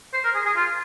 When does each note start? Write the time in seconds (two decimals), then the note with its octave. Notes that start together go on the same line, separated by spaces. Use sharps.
0.13 C5
0.24 A#4
0.34 G#4
0.45 G#4
0.56 F4